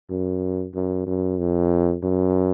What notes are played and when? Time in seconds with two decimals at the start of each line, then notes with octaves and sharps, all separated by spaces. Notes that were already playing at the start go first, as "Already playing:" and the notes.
0.10 F#2
0.74 F#2
1.07 F#2
1.39 F2
2.03 F#2